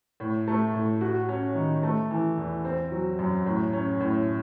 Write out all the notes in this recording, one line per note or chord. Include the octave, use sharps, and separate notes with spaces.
A2
A3
A2
F#4
C#4
D#3
A3
E3
E2
C4
F#3
F#2
A2
C#4
A2